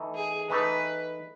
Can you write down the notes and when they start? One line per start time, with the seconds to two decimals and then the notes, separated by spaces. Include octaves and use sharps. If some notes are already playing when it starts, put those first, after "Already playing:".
Already playing: E3 A3 D#4
0.15 G#4
0.50 E3 A3 D#4 B4